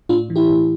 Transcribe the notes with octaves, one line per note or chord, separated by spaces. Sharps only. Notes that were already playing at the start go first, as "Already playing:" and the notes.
A2 D4 F4
E3
E4 G4
A2